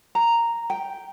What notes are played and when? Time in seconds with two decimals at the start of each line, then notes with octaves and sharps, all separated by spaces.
0.15 A#5
0.70 G5